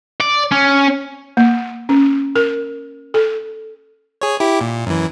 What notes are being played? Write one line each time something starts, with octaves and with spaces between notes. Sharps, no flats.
D5
C#4
A#3
C#4
A#4
A4
G#4 C#5
E4 G4
A#2
F#2 E3